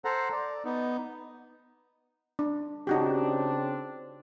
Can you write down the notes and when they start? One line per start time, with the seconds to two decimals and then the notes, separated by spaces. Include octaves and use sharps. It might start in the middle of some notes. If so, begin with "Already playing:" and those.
0.05 A4 C5 F#5 A#5
0.32 D5
0.65 B3 D#4
2.39 D4
2.87 C#3 C4 D4 D#4 F#4 G4